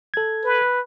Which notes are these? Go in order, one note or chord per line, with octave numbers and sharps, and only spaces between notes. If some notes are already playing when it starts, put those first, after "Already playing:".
A4 G#6
B4